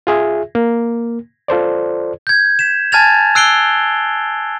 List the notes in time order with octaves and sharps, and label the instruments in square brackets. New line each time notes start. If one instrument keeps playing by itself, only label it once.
[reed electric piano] F4 G#4 E5
A#3
F4 A4 C5 D5
[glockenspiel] G6 G#6
B6 E7
G#5 A5 F6 G#6 A6 F7
E6 F#6 C7 D7 F7 G7